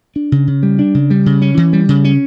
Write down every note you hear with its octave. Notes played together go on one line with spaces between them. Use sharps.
D4
C#3
C#3
G3
D4
C#3
G3
C#3
C#4
E3
G3
C#3
C#4